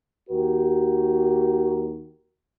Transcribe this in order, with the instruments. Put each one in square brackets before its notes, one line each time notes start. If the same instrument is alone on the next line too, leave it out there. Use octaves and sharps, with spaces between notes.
[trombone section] D#2 F#4 G4 A#4